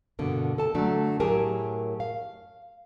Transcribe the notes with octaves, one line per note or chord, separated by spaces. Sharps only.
G2 B2 D3 A#3
A4 A5
D3 F#3 A3 D4
A2 F#3 G4 G#4 A#4 A5
F5